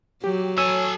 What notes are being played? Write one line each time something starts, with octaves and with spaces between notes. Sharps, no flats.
F#3 G4
A4 C#5 G#5 E6